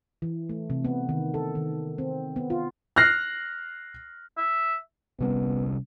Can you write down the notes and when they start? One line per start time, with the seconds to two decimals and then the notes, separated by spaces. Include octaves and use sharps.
0.22 E3
0.49 A3
0.70 C3
0.85 B3
1.09 D#3
1.34 A4
1.55 D#3
1.98 C4
2.36 B3
2.50 F4
2.96 F6 F#6 A#6 C7
4.38 E5
5.20 C3 G3 B3 C#4